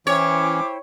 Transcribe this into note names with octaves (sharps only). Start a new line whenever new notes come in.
E3 C#4 E4 C5 C#5 G5 D6